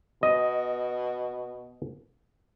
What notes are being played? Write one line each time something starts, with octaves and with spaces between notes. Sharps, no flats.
B2 D#5